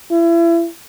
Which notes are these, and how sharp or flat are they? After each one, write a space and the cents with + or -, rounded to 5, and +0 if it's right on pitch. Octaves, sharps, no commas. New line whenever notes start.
E4 +35